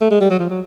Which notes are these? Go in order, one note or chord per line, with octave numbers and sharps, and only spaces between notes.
A3
G#3
G3
F#3
F3
F#3